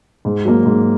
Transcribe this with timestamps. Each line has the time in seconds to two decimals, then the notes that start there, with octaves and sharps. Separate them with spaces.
0.25 G#2
0.45 F#3 A#3
0.65 G#2